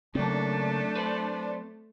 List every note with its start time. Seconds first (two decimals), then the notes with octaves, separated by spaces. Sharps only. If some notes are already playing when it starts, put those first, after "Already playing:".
0.15 C#3 F#3 A3 A#3 C4 D4
0.95 B4 C5 D5